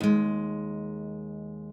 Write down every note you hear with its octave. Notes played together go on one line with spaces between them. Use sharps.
D#2 G#3